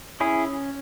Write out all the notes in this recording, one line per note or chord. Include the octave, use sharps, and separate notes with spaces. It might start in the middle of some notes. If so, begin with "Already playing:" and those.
C#4 E4 G#4